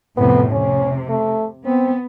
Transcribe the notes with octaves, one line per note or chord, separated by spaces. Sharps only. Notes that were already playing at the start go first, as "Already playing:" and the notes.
F2 A2 C3 B3
C3 C#4
A3
B3 C4